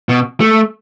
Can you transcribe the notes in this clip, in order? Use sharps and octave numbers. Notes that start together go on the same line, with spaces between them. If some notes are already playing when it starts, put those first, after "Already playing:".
B2
A3